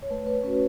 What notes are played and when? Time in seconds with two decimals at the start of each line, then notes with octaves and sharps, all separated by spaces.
0.03 C#5
0.10 A3 B4
0.27 B4
0.43 C#4 B4
0.47 F#4